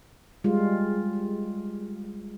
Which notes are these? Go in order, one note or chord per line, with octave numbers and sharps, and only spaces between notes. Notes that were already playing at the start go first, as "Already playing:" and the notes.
G3 G#3 F4